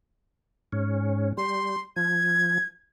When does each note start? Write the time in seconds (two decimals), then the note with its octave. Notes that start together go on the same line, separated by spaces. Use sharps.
0.72 G#2 C#4
1.37 G3 C6
1.96 F3 G#6